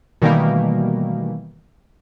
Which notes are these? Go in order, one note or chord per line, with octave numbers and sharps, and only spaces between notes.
B2 D#3 E3 G3 A3 A#3